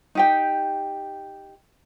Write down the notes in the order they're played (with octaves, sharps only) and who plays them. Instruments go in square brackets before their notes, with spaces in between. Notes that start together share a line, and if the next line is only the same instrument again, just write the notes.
[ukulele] D#4 G4 G5